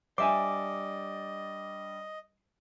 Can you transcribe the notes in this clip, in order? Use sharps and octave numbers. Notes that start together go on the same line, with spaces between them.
G3 D4 C5 D#5 E5 G#5 D6